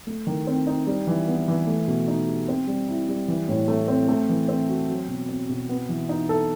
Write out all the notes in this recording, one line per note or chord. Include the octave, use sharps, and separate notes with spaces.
A3
D#3
C4
D#4
G3
E3
B3
E3
A3
B2
D#4
G4
C4
G3
E4
G3
E3
A2
A3
C4
A3
E3
C4
F#4
F#3
B2
C4
B2
B3
E3
D#4
A4